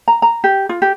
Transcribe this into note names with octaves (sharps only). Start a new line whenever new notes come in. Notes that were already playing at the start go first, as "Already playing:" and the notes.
A#5
A#5
G4
F4
G4